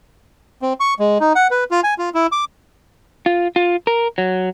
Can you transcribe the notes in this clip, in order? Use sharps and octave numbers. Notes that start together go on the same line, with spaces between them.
C4
C#6
G#3
D#4
F#5
B4
F4
G#5
F4
E4
D6
F4
F4
A#4
F#3